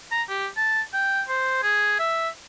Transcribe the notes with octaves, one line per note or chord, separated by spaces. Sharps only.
A#5
G4
A5
G5
C5
G#4
E5